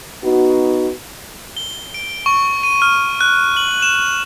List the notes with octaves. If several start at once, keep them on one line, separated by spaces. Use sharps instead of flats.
B3 D#4 F#4
G7
D7
C#6
D#7
F6
F#6
F#7
E7